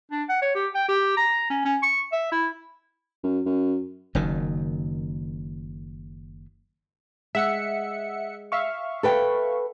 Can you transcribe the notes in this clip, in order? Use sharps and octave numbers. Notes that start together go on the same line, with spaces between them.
D4
F#5
C#5
G4
G5
G4
A#5
C#4
C#4
C#6
E5
E4
F#2
F#2
F#1 F#2 D#3
G#3 E5 F#5 C#7
E5 F5 C#6
A4 B4 G5